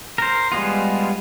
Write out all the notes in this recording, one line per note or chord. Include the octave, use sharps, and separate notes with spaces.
A#4 C5
G3 G#3 B3 F4